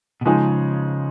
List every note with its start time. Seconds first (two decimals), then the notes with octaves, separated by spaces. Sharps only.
0.21 B2
0.25 C#3 F3 G#3 D#4 G#4